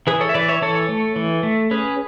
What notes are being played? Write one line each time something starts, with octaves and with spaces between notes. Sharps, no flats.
E3 G#4 B4
A4 C#5
E5
E3 B4 D5
C#5 E5
E3 A4 C#5
A3
E3
A3
C#4 G#4 B4